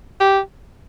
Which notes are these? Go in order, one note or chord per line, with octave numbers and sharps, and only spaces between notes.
G4